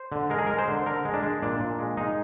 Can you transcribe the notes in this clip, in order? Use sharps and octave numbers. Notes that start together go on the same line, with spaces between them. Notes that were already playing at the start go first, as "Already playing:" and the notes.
Already playing: C5
D3
G#3 A#4
G#4
G#3 A#4
C5
D3
D3 A#4
G#3
D4
G#3
A#2 D4
A#2
G#3
G#3 D#4